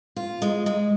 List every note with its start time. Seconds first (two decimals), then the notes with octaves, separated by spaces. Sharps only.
0.16 F4
0.42 G#3
0.66 G#3